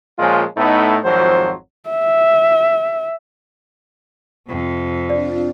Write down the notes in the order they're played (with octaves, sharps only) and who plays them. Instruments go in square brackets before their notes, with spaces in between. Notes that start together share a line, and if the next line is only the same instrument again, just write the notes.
[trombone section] A#2 F3 G#3 C#4 F4
A2 A3 B3 D#4
G#1 F2 F3 F#3 C5
[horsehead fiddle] E5
[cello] F2 C3
[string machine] C4 D4 F4 [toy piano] D5